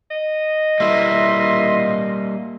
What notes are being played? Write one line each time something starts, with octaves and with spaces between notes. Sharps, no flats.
D#5
G3 A#3 E4 E5 C6